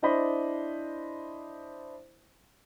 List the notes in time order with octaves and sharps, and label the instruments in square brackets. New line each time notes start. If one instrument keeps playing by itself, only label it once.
[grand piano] D4 E4 C5 D#5 B5